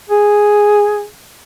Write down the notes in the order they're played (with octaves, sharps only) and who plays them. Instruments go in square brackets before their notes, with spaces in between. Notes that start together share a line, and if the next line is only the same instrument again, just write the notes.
[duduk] G#4